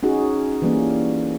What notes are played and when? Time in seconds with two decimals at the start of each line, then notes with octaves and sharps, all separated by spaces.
0.03 C#4 D#4 F#4 G#4
0.62 E3 G3 A#3 C#4